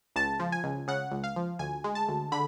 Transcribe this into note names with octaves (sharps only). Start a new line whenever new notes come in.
C#2 A5
F3
G#5
C#2
C#3 F#5
C#2
F5
F3
D2 G#5
G#3
A5
D2
D3 B5